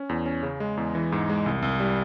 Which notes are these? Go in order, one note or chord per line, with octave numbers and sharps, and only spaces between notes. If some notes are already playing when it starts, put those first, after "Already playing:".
Already playing: C#4
E2
C#4
C#3
G#3
E2
E3
G#2
G#3
C2
C2
G3